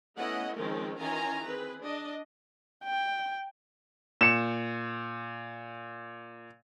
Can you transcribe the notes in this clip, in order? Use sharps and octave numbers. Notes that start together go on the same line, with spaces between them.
A3 B3 C#4 E4 D#5 F#5
D#3 F3 G#3 C4 C#4 A#4
D#3 E3 C#4 F4 G#5 A#5
C4 G#4 B4
D4 D#5
G5
A#2 C#7 E7